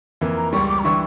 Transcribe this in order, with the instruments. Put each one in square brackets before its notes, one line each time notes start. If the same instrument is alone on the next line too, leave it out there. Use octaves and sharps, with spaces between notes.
[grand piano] F2 E3 A#3
[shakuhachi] A#5
[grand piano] C#2 C#3 G3 [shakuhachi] C#6
[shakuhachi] D6
A#5
[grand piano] E3 G3 D4 [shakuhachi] C#6